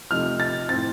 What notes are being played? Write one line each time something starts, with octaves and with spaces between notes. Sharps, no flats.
C3 F3 A3 D#4 F6
A6
A2 A3 C4 D#4 A6